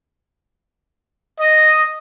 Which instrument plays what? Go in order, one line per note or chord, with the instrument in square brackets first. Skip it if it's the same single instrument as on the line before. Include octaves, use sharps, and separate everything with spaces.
[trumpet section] D#5